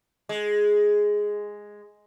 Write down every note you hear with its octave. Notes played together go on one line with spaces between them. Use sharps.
G#3